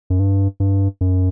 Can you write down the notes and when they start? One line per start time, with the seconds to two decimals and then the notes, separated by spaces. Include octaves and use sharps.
0.10 F#2
0.20 G2
0.60 G2
1.01 F#2